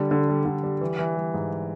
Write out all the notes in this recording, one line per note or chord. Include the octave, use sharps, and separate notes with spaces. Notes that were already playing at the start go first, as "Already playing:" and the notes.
Already playing: D3 G3
D3
G3
D3
G3
E3
E3
G3
G#2